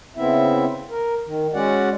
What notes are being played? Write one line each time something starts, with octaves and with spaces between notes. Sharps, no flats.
C#3 B3 C4 E4 E5
A#4
D#3
G#3 C#4 F#4 D5 F#5